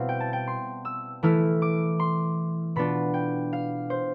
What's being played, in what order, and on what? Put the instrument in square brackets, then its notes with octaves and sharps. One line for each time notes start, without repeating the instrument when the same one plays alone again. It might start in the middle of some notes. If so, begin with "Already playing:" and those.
Already playing: [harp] B2 G3 C4 E4 F5
G5
A5
G5
C6
E6
E3 A3 E4 F6
D6
C6
B2 B3 D4 F4 B5
G5
F5
C5